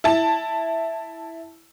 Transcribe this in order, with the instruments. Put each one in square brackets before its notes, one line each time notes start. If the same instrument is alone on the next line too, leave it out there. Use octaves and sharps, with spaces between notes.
[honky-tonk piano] E4 A5